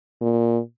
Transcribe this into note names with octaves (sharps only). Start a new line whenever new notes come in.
A#2